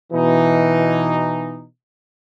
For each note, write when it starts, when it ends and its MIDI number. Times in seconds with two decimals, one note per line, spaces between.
0.13 1.65 47
0.13 1.65 52
0.13 1.65 63